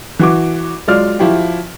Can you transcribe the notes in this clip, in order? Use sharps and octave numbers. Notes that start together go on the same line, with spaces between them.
E3 F#4 D6
F#3 G#3 F4 D5 F6
F3 E4 F#4 G4